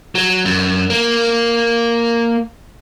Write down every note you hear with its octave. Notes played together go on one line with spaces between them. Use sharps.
F#3
F#2
A#3